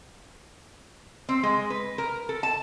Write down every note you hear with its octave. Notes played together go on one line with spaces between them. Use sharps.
C4
G#3
B4
A#4
A4
A5